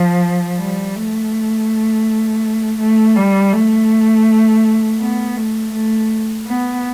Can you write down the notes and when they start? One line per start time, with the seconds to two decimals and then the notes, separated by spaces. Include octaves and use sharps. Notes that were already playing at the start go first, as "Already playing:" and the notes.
Already playing: F3
0.58 G3
0.95 A3
2.79 A3
3.16 G3
3.53 A3
5.00 B3
5.37 A3
5.73 A3
6.47 B3